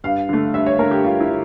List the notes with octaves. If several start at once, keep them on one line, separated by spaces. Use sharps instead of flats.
G2 F5
D3 A3
G2 E5
C#5
D3 A3 A#4
G4
G2 F4
E4
D3